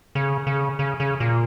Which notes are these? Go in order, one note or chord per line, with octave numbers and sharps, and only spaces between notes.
C#3
C#3
C#3
C#3
A#2